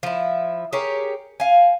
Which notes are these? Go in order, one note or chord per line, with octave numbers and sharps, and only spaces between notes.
F3 E4
G4 G#4 A#4 C#5
F5 G#5